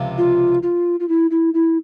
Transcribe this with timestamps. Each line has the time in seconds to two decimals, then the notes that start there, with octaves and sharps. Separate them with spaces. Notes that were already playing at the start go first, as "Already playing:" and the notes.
Already playing: C#2 C3 F3
0.18 F4
0.63 F4
1.00 F4
1.09 E4
1.31 E4
1.54 E4